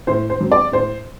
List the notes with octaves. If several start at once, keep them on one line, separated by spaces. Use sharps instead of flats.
A2 C5
C5
F#3 C4
D5
A2 C5